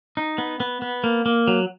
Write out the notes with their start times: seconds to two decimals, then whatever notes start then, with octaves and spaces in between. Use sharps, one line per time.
0.17 D#4
0.38 B3
0.60 B3
0.82 B3
1.04 A#3
1.26 A#3
1.48 F#3